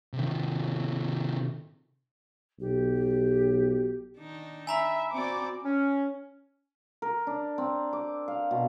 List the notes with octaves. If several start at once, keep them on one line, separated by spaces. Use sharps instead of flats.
C3 D#3
B1 G4
D#3 D4 D#4
E5 G#5 A#5 B5
C4 F#4 D5 D6
C#4
A#4
D4
C4
D6
F5
B2